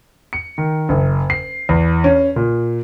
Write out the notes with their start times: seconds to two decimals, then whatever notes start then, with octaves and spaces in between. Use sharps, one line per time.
0.33 C#7
0.58 D#3
0.89 F#1
1.30 C7
1.69 E2
2.04 C#4
2.36 A#2